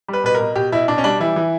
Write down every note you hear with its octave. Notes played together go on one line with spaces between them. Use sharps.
G3 B4
B2 B4
B2 A#4
B2 G4
B2 E4
B2 D4
C#4
G3 D4
E3 E4
E3